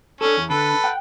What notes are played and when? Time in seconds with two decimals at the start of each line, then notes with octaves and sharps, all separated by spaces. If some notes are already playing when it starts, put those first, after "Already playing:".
0.21 C#4 D4 A4
0.37 E2
0.50 D3 A4 B4
0.84 F#5 G5